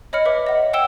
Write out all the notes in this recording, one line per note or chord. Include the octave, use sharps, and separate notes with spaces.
C#5 D#5 B5 F6 C#7
B4 C#5 E5 D6
D#5 F#5
C#5 F#5 G5 E6 E7 G7